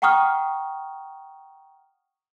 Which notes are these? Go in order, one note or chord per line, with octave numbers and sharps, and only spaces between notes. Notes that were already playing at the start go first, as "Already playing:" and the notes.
F#5 G5 A#5 C#6 D#6 F6